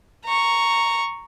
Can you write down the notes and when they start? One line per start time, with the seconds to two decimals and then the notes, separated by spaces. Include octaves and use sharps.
0.25 A#5 C#6